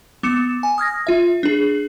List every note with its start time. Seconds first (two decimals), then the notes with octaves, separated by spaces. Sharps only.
0.23 B3 D6 C#7 E7
0.63 G#5
0.78 D#6 F6 G#6 A#6
1.07 F4 E5
1.43 D4 G#4